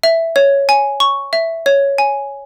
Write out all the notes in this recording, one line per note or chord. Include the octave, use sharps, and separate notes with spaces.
E5
C#5
G#5
C#6
E5
C#5
G#5